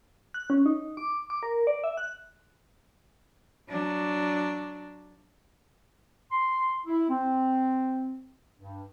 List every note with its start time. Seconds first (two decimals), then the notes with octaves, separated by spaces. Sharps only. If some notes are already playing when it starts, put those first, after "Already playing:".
0.34 F#6
0.50 C#4
0.66 D#4
0.97 D6
1.30 D6
1.43 A#4
1.67 D5
1.84 E5
1.97 F#6
3.69 F#3 D4
6.31 C6
6.86 E4
7.08 C4
8.58 G2